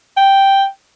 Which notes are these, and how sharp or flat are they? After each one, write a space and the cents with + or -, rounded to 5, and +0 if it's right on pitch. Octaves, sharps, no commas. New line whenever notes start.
G5 +0